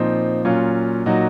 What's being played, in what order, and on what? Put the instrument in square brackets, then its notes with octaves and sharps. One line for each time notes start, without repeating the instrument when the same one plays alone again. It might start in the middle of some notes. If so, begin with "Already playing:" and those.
Already playing: [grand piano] A#2 F3 C4 D#4
A#2 F#3 C#4 F4
A#2 F#3 D#4 F#4